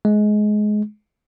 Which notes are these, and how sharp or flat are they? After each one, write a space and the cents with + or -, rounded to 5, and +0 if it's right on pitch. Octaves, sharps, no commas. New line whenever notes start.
G#3 +20